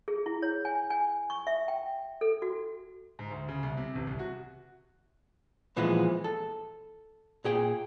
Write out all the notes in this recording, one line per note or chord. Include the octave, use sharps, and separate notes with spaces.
G#4
E4
C#5
G#5
G#5
C#6
E5
G5
A4
F#4
G#2
D2
C#3
C2
C3
A1
C2
F#4
A#2 E3 F3 G#3 B3
A4
A#2 G#4 G5